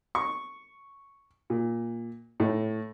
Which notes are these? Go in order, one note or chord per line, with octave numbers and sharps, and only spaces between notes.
C#6
A#2
A2